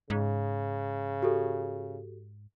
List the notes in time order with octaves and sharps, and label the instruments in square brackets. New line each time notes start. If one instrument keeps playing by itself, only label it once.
[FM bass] G#2 [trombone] C#3
[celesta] F#4 G4 A4